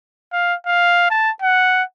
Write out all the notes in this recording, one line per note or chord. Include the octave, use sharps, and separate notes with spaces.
F5
F5
A5
F#5